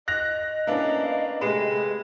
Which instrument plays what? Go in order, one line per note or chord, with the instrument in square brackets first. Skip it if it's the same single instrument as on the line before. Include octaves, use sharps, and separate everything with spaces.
[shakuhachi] D#5 [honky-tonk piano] F#6 A#6 F7
[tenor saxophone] A#3 [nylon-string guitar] B3 C#4 [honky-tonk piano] D4 E4
[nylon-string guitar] C3 A3 G4 [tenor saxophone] G#3 [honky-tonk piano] B4